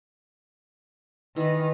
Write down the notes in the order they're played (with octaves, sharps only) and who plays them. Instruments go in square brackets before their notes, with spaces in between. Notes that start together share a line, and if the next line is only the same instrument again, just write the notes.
[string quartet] D#3 [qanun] E3 B4